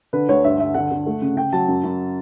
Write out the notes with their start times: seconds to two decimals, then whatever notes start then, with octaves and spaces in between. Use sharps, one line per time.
0.13 D3 B4
0.29 D2 C#5
0.44 G2 E5
0.59 G2 E5
0.74 D3 F#5
0.91 D3
1.06 A3
1.22 C#3
1.36 C#3 G5
1.52 F#3 A5
1.68 F#2
1.84 F#2